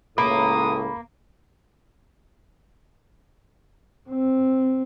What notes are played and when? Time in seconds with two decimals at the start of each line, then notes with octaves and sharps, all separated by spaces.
0.18 C#2 A2 A#3 B5 D#6
4.10 C4